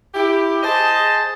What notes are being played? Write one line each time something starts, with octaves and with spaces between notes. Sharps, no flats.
E4 G4
G#4 C5 D#5 A5